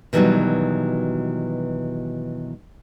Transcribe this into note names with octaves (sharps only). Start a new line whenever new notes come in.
B2 D#3 E3 F#3 G3 B3